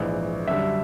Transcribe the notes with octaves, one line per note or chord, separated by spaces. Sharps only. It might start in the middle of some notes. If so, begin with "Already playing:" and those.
Already playing: A#1 G#2 E3
F#2 D3 G3 E5